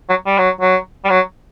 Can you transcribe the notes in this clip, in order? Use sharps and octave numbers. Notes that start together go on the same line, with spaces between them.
F#3
G3
F#3
F#3
G3
F#3